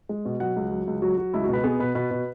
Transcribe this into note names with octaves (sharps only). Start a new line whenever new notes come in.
G#3
B2
F#3 F#5
C#2
F#3
C#2
F#3 F#4
F#3 F#4
C#2 E4
F#4
B2 B4
B3 G#4
B2 B4
B2 B4
B2